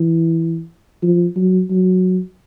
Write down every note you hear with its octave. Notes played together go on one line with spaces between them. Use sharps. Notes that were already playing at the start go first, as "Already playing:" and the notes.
Already playing: E3
F3
F#3
F#3